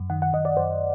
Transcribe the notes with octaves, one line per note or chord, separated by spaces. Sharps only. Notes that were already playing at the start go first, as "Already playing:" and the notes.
Already playing: F#2
D#3 F#5
F#5
F#2 D#5
D5
F#2 C5